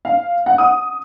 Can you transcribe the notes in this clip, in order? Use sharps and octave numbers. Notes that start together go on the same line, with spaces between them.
F5
F#5
D#6